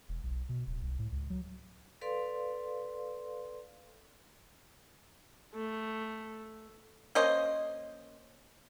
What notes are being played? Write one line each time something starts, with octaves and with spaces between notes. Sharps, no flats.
E1
B1
B2
D1
C2
A2
C#2
F#3
A4 B4 D5 F5 C6
A3
A#3 C#4 C5 D#5